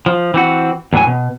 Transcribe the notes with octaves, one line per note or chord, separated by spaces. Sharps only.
F3
E3 C4 F#4
E2 A2 E3 F#3 G#5
B2